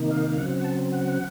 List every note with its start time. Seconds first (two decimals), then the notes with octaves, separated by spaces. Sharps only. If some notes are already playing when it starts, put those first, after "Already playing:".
Already playing: C3 D#3 A#3 D#4
0.11 F5
0.30 F5
0.37 C#3 F#3 C4 F#5
0.59 F#5
0.64 A5
0.92 F#5